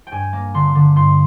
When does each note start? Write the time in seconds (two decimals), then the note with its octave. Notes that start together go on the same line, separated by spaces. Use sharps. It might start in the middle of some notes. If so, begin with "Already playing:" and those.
0.07 G5
0.12 G2 G#5
0.33 A#3
0.54 D3 C6
0.75 D3
0.96 G2 C6